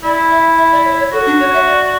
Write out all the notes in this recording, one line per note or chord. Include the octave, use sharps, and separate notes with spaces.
E4 D5
E5
E5
D5
C#5
C#5
F#4 A4
D4
C#5
E5
D5